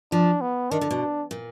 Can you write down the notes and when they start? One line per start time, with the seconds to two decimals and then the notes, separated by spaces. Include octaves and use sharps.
0.12 F3 D4
0.41 B3
0.71 D#3 D4
0.81 D3
0.90 B2
1.31 A#2